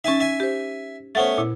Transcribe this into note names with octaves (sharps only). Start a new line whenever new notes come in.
C#4 D#4 E5 G#5 A5
E5 G#5
G4 C5
A3 B3 C#4 C5 F#5 A6
A#2 E4